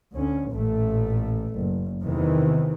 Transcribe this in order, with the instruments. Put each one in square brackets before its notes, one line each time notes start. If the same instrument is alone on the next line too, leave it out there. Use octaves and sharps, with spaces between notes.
[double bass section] D2 C#4
A1 A#2 A3
F#1
E2 C3 D#3 E3